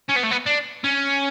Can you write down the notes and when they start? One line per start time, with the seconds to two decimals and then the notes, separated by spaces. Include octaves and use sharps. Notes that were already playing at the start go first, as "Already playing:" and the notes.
0.09 C#4
0.16 B3
0.24 A3
0.31 B3
0.46 D4
0.84 C#4